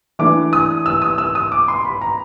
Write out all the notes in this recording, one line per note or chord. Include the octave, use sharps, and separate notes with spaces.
E3 A3 D4 D6
D#6
E6
D#6
E6
D#6
D6
C6
B5
A#5